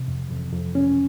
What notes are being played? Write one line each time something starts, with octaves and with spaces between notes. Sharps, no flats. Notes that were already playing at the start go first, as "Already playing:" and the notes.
Already playing: C3
F2
F2
F2
C#4